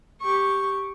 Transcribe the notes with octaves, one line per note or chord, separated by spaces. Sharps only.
G4 C#6